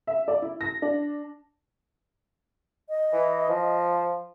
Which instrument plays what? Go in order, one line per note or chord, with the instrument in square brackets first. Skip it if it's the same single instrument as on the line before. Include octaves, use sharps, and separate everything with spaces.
[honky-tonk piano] E5
D5
E4
A#6
D4
[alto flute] D#5
[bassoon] E3
F3